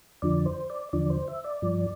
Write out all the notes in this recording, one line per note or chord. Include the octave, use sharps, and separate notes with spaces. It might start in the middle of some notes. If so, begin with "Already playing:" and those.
F2 D3 F3 D5
C5
D5
E2 D3 F3 D5
C5
E5
D5
G2 F3